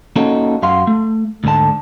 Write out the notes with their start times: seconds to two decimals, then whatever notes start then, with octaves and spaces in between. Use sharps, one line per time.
0.16 A#3 C#4 D#4 F#4 A4
0.62 F#2 F#4 F5 C6
0.87 A3
1.44 D2 G#2 D3 A5